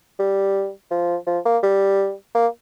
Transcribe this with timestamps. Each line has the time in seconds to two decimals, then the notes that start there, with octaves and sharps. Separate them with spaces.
0.20 G3
0.91 F3
1.27 F3
1.46 A#3
1.63 G3
2.35 A#3